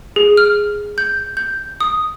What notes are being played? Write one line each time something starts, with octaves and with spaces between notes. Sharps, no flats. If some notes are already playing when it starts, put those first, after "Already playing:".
G#4
F6
G6
G6
D#6